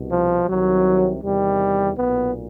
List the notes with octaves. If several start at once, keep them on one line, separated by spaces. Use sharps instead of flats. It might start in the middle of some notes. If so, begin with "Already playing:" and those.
Already playing: C2 B2
F3
C2 C3 D#3 F#3
E2 C3 D#3 G3
B1 A#2 B3